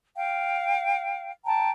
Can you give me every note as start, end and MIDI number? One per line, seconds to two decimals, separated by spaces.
0.16 1.32 77
0.16 1.32 79
1.45 1.71 79
1.45 1.71 81
1.45 1.71 82